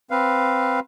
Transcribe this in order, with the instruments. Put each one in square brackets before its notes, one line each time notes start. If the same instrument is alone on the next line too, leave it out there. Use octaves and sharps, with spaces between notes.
[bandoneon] C4 B4 F5